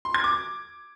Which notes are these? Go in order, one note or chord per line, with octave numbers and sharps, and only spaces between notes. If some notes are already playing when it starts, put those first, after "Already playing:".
C6
G#6
D6